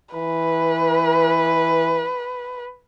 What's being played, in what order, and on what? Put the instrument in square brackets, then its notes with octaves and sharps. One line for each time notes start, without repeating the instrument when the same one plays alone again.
[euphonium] E3 [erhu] B4